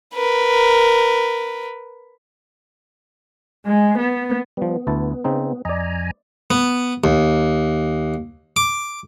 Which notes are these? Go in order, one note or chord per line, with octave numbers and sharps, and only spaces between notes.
A#4 B4
G#3
B3
F3 G3 B3
D2 E4 A5
C#3 C4 D#4
F2 D5 D#5 G#5 A#5
B3
D#2
D6